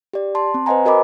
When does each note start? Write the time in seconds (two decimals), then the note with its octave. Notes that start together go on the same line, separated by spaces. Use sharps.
0.13 G4 D5
0.35 A5 C6
0.54 C4
0.66 B4 C5 D#5 F#5 G#5 A#5
0.85 F#4 A#4 D#5 A#5 B5 D6